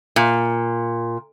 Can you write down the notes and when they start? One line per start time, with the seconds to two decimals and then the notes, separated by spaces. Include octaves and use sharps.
0.16 A#2